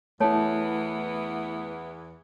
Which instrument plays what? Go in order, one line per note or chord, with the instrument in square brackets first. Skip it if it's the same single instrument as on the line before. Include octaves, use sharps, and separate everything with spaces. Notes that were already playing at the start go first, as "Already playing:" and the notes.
[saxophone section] E2 E3 B3 [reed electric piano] A3 E4 [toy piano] C#5 A5